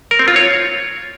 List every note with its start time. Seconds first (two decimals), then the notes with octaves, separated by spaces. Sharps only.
0.11 A#4
0.19 C4
0.28 F4
0.36 C#5